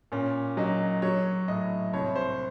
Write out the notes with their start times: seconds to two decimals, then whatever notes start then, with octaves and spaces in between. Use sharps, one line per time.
0.12 A#2 C#4
0.57 F#3 D#4
1.02 F#3 C#5
1.48 A2 D#5
1.93 C2 C#5
2.16 C5